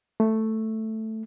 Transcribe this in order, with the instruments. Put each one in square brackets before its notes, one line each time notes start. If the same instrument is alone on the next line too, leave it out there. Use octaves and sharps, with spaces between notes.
[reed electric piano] A3